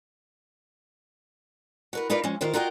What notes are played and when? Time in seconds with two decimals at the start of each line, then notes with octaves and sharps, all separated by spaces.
1.93 F#4 A#4 B4
2.10 D#4 F4 A#4 B4 D5
2.24 F3 G#3 C#4
2.41 D#3 F4 G4 A#4 C5
2.54 F4 F#4 A#4 D#5 E5 G5